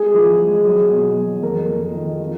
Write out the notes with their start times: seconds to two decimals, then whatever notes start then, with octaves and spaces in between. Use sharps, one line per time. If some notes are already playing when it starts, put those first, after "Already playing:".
Already playing: G#3 G#4
0.14 F3
0.40 G#3
0.65 F#3
0.91 B2
1.16 F#3
1.42 F2 A#4
1.69 F2
1.94 D#3
2.20 F3